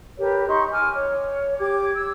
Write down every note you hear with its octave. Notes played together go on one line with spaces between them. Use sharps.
G4 A#4 B4 C#5
D#4 C6 C#6
G#5 D6 F6
C#5
G4 D6 G#6
E6 G#6